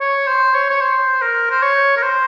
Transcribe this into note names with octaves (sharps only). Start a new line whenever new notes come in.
C#5
C5
C#5
C#5
C5
A#4
C5
C#5
A#4
C5